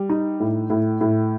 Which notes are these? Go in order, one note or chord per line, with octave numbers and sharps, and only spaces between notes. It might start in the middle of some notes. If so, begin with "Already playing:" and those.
Already playing: G3
D#4
A2
A2
A2